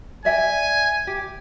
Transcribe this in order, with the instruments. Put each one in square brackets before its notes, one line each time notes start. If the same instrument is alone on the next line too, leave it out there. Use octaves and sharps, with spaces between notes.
[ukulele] D5 E5 G5 [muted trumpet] G#5
[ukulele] G4